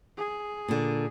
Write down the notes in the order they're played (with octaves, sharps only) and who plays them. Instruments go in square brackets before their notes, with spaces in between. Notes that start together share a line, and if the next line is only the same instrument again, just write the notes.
[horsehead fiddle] G#4
[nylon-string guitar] A#2 D3